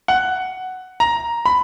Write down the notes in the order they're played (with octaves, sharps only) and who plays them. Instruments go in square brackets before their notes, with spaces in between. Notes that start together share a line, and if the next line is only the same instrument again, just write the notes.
[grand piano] F#5
A#5
B5